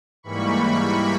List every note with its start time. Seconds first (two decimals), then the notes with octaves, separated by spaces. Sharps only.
0.23 G#2 E3 G3 A#3 B5 C#6